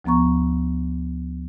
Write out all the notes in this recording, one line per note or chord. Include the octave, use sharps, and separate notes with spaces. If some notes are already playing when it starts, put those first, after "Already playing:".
D2 F3 B3 A#5 C#6